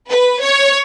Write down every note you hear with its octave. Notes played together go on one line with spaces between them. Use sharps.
B4
C#5